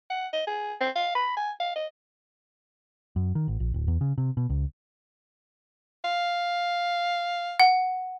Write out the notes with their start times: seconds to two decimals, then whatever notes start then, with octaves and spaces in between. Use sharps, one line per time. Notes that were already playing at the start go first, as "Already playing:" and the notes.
0.10 F#5
0.33 D#5
0.47 G#4
0.81 C4
0.96 F5
1.15 B5
1.37 G#5
1.60 F5
1.76 D#5
3.16 F#2
3.35 D#3
3.48 A1
3.60 A#1
3.74 D1
3.88 E2
4.01 C#3
4.18 C3
4.37 B2
4.49 C#2
6.05 F5
7.60 F#5